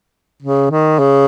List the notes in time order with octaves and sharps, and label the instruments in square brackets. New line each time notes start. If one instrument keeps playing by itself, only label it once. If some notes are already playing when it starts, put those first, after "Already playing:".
[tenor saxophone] C#3
D#3
C#3